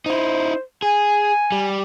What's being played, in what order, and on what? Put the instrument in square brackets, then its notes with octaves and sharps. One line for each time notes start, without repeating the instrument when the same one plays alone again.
[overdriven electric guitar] D#4 E4 [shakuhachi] C5
[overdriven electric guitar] G#4 [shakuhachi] G#5
[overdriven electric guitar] G3